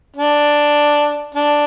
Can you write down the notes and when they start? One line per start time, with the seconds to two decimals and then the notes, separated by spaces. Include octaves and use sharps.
0.16 D4
1.34 D4